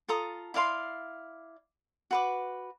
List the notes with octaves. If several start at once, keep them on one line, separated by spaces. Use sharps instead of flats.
F4 A4 A#5 D#6
E4 D5 F5 C6
F#4 B4 D6